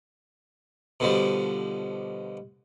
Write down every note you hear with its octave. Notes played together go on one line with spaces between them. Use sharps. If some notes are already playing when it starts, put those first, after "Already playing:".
B2 D3 F3 G3